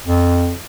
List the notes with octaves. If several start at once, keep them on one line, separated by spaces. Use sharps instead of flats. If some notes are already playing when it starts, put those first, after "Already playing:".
F2